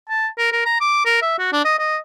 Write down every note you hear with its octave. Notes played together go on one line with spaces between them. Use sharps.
A5
A#4
A#4
A#5
D6
A#4
E5
F#4
D4
D#5
D#5